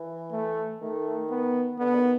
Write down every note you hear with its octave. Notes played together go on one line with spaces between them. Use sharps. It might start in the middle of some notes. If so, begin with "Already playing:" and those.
Already playing: E3
A3
D#3 A3
B3
D3 B3
D#3